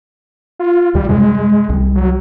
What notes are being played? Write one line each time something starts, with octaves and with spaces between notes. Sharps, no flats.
F4
D#2 G3
F#2 C3 G3 G#3
C2 G3
F#3